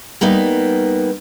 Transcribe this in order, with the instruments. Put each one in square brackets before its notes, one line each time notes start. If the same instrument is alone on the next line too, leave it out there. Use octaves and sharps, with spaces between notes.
[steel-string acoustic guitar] G3 A#3 B3 D#4